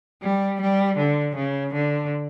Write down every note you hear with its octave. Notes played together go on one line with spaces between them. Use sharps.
G3
G3
D3
C#3
D3